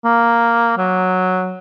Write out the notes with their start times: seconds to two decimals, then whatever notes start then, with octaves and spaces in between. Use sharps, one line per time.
0.05 A#3
0.77 F#3